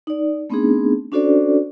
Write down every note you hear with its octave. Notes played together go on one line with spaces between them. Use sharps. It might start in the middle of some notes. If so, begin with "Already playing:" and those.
D#4 D5
A3 B3 C4 D4 D#4 G#4
C#4 D4 F#4 A4 C5 D5